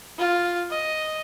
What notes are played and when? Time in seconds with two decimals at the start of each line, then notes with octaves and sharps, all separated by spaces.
0.18 F4
0.71 D#5